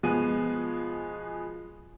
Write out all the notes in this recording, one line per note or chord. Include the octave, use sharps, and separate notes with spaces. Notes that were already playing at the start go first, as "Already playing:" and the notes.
B2 F3 G#3 B3 G#4 D#7